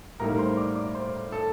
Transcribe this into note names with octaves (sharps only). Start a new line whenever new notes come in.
A2 G3 A#3 D#4 A#4 A#5
C5 C6
D5 D6
D5 D6
C5 C6
A4 A5